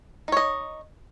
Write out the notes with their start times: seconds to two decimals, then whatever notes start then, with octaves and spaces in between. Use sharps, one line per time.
0.28 D#4
0.32 C#5
0.37 D#5